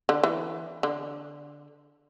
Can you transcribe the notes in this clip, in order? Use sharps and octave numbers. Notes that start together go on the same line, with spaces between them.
D3
E3
D3